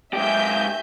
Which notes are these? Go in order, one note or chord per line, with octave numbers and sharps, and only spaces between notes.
G#2 G4 E5 G#5 G6